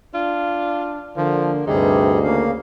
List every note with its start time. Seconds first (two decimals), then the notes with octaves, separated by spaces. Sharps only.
0.14 D4 F4
1.16 D3 F3 A#3
1.67 D2 G2 C3 G3 D#4 G#4
2.23 C#3 A#3 F5